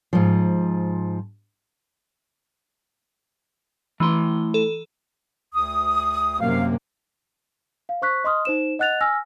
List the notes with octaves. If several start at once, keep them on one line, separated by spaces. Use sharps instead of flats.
G#2 F3
E3 A3 E4 C6
A4
D2 D#6
F#2 C3 A#3 F5
F5
C5 C#6 F#6 B6
D#5 C6 D#6 F6
D#4 C5 E7
D#5 F#5 F#6 A6 F7
G#5 E6 F6 A#6